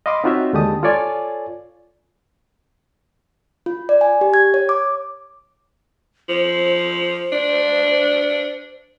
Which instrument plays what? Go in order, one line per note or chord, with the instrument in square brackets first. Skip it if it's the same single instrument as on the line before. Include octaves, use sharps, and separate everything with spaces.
[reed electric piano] D#5 F5 B5 C6 D6
C4 D#4 F4 F#4 C#5 E5
D#2 D3 G#3 G4 A5 D#6
F4 A4 C#5 D5 G#5
[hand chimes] F4
D5
G#5
G4
G#6
C#5
D6
[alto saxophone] F3 [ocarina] C5
[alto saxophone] D4